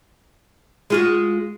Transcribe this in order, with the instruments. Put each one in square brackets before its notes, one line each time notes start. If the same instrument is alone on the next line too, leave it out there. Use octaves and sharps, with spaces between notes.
[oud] G#3 F4 F#4